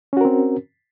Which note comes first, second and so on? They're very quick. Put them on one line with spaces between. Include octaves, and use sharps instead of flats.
C#4 F#4 A#4 C4